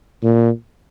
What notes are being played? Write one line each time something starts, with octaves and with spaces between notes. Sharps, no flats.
A#2